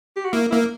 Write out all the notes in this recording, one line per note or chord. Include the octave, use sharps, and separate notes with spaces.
G4
F#4
A#3 E4
A#3 E4